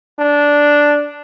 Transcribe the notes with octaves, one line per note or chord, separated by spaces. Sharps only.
D4